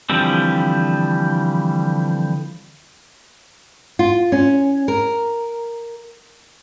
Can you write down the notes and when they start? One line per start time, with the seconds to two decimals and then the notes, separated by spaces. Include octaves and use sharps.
0.10 D3 E3 F3 G3 C4
3.99 F4
4.32 C#4
4.88 A#4